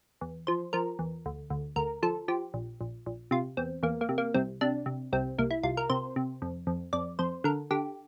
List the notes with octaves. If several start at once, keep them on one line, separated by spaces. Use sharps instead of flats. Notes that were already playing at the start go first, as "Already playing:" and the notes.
E2
F3 C5
F3 A#4
E2
D2
D2
D2 A#4
F3 A4
F3 G4
A#1
A#1
A#1
C3 F4
E2 C4
E2 A#3
A#3
C3
A#3
C2 C4
C3 D4
C3
C2 C4
C2 A#3
E4
C2 F4
A#4
C3 C5
C3
F2
F2
F2 D5
F2 C5
D3 A#4
D3 G4